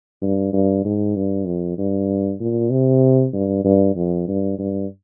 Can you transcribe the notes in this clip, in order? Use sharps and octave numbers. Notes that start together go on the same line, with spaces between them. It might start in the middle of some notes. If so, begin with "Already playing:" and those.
G2
G2
G#2
G2
F2
G2
A#2
C3
G2
G2
F2
G2
G2